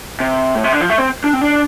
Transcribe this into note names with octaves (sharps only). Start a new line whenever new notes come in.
C3
A2
C3
D3
F3
A3
C4
D4
C4
D4